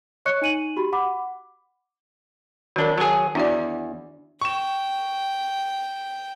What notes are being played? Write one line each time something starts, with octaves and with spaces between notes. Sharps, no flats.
C#5 D#5 C#6 F#6 C#7
D#4 G#5 D#7 F#7
F#4 G4 B5
F#5 B5 D6
D#3 F#3 D4 A#4
F#3 G#4 C#5 A5
E2 D4 F#4 D5
G5 C#6 E7